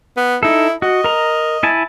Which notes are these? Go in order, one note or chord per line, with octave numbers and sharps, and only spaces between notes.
B3
D#4 E4 A4
F#4 D#5
A#4 A#5
E4 G#5 A5